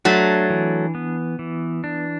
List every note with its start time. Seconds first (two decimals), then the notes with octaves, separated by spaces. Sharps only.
0.05 F#3 A3 D4
0.50 E3
0.95 B3
1.39 E3
1.84 D4